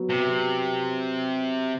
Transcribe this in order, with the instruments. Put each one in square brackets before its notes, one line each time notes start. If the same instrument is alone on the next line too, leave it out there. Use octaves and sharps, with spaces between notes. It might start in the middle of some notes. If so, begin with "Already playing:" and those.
Already playing: [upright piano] F#3 B3
[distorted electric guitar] C3